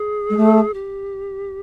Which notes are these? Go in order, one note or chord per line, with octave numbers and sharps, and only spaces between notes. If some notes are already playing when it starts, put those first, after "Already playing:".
Already playing: G#4
G#3
A3
G4